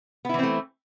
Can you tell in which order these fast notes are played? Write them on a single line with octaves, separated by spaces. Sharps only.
B3 E4 E3 C4 A3